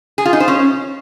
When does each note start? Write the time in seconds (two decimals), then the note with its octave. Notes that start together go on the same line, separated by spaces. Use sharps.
0.18 G#4
0.25 F4
0.33 D#4
0.40 C5
0.48 C#4